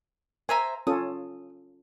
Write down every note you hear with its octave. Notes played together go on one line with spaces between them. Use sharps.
C5 E5 G#5 A#5
C#4 F4 A4 D#6